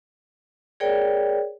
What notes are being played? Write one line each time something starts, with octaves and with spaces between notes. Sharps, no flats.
G#4 A#4 C#5 D5 G5